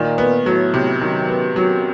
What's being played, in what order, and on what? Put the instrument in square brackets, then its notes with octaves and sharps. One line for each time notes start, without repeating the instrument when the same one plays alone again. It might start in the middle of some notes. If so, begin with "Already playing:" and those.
Already playing: [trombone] A#2 [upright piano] D#3
[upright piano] B3
[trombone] A2 [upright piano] F#3
[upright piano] C3
[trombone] F#2 [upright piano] D#3
[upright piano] B3
[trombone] F#2 [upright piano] F#3